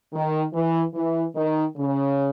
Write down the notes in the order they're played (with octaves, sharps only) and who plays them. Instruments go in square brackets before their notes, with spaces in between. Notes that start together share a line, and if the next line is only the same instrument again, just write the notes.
[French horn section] D#3
E3
E3
D#3
C#3